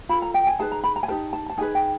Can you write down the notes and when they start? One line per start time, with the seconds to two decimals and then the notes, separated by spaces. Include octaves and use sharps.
0.09 F4 A4 B5
0.22 A#5
0.34 G5
0.47 G#5
0.59 D#4 G#4 B4 A5
0.72 A#5
0.84 B5
0.96 A#5
1.03 G#5
1.08 D#4 G4 A#4 A5
1.33 A5
1.49 A5
1.58 D#4 G#4 B4 G#5
1.75 G5